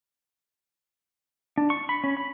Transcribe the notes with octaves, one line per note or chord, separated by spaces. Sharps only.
D4
C#6
B5
C#4
B5